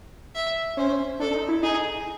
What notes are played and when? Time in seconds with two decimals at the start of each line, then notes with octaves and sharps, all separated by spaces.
0.35 E5
0.77 C#4 C5
1.20 D4 A4
1.34 D#4
1.48 E4
1.63 D#4 G#4